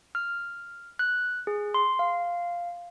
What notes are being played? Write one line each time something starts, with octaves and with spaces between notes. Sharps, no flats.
F6
F#6
G#4
C6
F5